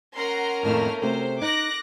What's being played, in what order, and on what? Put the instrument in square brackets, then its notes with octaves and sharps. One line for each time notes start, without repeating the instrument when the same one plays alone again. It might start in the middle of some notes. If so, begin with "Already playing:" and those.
[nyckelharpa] C#4 A#4 [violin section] F#5 A#5 C6
[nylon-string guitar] F2 A2 D#3 [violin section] A3 A#3 F6
[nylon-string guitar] C3 A3 F#4 [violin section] C5
[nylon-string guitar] D#4 [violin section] D6 F#6 A#6